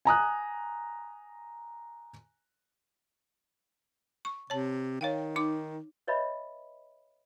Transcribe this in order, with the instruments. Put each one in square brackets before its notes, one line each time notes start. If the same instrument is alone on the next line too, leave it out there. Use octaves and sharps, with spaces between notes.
[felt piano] G#5 A#5 D#6 F#6
[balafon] C#6
[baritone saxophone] C3 [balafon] C#5 A5
[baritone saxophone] D#3 [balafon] C#5 F5 G5
[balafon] D#4 D6
[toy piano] B4 C#5 D#5 E5 A5 B5